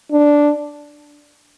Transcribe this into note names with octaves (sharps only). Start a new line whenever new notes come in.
D4